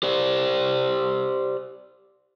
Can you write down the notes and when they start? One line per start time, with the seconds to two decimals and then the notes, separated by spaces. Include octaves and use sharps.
0.03 G4 C5 D5